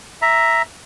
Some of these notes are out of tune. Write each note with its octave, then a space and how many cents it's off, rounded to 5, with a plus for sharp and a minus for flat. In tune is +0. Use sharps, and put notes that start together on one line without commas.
E5 +0 A#5 +0